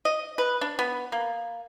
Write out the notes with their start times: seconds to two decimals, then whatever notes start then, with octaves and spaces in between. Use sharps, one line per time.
0.05 D#5
0.38 B4
0.61 D4
0.79 B3
1.12 A#3